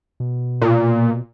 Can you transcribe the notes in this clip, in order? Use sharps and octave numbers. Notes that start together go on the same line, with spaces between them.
B2
A#2